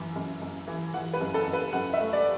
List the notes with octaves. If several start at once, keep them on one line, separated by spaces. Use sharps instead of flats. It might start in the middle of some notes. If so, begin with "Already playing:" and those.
Already playing: F#2 E3
F#2
F#2
E3
E3 F#5
B4
F#2
A4
F#2
B4
F#2 F#5
E5
A3
D5